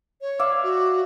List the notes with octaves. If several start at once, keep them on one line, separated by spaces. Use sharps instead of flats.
C#5
D5 E5 F5
F#4